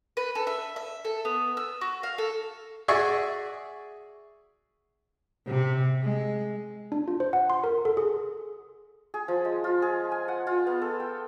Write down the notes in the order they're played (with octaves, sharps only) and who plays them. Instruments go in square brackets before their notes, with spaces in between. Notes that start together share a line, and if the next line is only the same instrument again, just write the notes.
[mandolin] B4
A4
E5
E5
A4
B3
E6
F#4
F5
A4
[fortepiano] F#4 G#4 D5 E5 G#5 C#6
[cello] C3
G#3
[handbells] D4
F4
C5
F#5
C6
A#4
A4
G#4
[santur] G#4
F3
G#3
F4
G#4
G#5
F#5
F4
B3
A4
G5